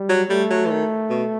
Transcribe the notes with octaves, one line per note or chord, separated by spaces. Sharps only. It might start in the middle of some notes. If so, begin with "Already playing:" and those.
Already playing: G3
F#3
G3 A3
F#3
E3
D#3
B2